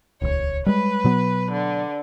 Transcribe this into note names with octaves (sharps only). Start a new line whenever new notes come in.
D#1 C#2 C#5
G3 G#3 B4
B2 F#3 B3
D3